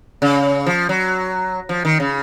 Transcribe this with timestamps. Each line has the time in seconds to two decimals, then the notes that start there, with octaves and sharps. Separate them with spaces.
0.22 C#3
0.66 F3
0.89 F#3
1.69 F3
1.85 D#3
2.00 C#3